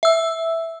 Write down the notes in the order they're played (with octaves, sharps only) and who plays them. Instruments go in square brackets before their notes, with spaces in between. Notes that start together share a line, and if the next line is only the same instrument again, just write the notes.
[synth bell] E5 E6